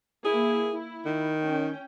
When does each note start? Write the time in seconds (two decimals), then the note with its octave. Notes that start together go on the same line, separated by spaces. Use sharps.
0.25 A#3 E4 G#4
0.73 E4
1.05 D#3
1.43 C#4 G5